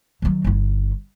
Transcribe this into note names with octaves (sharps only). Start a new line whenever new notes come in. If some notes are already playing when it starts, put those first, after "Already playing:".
D#3 F#3
G1 E4